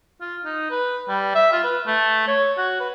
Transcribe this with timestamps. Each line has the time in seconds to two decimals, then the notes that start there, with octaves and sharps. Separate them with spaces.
0.21 F4
0.45 D#4
0.71 B4
1.09 G3
1.35 E5
1.52 F4
1.64 B4
1.87 A3
2.28 C#5
2.58 F#4
2.80 B4